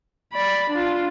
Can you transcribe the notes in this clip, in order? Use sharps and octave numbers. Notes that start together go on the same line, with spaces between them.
D5 B5
D4 F4